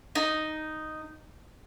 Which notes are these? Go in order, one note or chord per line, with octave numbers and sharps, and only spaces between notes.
D#4